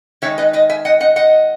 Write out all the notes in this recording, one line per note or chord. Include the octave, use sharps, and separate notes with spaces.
D#3 G#3 D#4 C#5 E5
B4 D#5
B4 D#5
E5 G#5
D#5 F#5
D#5 F#5
D#5 F#5